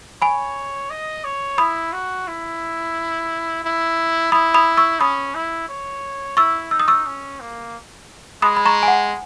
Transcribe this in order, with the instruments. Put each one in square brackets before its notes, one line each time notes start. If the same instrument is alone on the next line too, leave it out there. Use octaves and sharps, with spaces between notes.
[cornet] C#5 [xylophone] G#5 B5
[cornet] D#5
C#5
[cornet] E4 [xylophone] B5 D#6
[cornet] F#4
E4
E4
[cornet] E4 [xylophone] B5 D#6
[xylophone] B5 D#6
C#6 E6
[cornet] C#4 [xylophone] B5 D#6
[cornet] E4
C#5
[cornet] E4 [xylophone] C#6 E6
[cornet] D#4 [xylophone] E6
[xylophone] D#6
C#6 E6
[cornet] C#4
A#3
[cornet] G#3 [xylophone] B5 D#6
[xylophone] B5
A#5 C#6
G#5
F#5